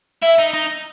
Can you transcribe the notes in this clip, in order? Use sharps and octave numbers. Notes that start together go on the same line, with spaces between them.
E4 E5
D#4
D#4